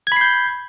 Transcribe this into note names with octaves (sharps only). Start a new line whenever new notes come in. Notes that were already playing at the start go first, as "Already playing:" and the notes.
B5 G6 G#6 C7